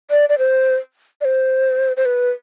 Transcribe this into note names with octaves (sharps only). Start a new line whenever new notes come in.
D5
D5
C5
D5
C5
C5
B4